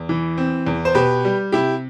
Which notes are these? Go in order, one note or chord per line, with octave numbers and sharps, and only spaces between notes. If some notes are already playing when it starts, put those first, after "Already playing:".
Already playing: E2
E3
C4
E2
C5
B2 G4 B4
G3
C3 E4 G4